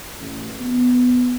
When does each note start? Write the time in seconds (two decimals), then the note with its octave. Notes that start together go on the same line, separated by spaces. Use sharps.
0.19 A1
0.60 B3